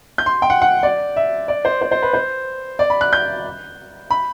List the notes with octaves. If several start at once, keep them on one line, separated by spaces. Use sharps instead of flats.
G6
C6
G5
F#5
F#5
D5
E5
D5
C5
C5
C5
B4
C5
D5
B5
F#6
G6
B5